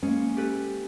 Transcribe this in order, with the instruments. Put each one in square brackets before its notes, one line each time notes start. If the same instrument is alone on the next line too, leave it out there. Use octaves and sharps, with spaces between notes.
[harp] G#3 A#3 [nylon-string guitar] C#4
[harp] G4 A4 B4